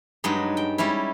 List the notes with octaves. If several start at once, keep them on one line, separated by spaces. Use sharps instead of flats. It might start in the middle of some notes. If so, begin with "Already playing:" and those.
G2 F#3 G#3 D#4
G5
G3 G#3 C#4 E4